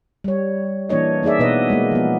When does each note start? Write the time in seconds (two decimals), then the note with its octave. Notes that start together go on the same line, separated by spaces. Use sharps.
0.24 G3 C#5
0.89 E3 A#3 D4 C#5 D#5
1.23 A#3 D#4 G#4 D5 E5
1.39 B2 B3 B4 D#5
1.70 G#3 A#3
1.91 F3 B3